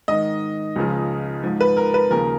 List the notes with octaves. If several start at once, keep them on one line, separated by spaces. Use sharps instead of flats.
G#2 D#3 D#5
C#2 C#3 F3
G#2 F3
B4
A#4
B4
D#2 C#3 F3 A#4